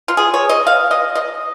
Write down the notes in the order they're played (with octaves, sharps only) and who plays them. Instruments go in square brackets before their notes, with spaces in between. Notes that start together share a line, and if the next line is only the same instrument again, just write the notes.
[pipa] F4
G#4
C#5
D#5
F5
D#5
D#5